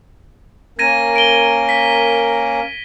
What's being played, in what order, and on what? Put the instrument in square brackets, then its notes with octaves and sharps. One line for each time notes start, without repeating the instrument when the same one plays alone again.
[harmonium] A#3 C#4 A#4 [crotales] G#6 A#6 D#7
[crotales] D7 G7
B6